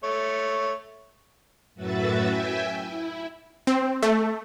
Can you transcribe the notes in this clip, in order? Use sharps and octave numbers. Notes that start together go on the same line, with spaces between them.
A3 C#5
F#2 A2 F#4 B4 E5 A6
E5 G5 G#5
E4
C4
A3